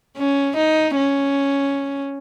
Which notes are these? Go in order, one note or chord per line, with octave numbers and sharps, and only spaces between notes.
C#4
D#4
C#4